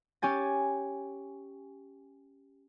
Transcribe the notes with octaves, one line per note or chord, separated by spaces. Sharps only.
C#4 G4 G#5 A6